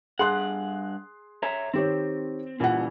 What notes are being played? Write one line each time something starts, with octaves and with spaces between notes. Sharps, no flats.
G2 G#4 F#5 C6 F#6
C#5 E5 A#5
D#3 C4 G4 C#5
A#2 C#3 E3 G3 F#5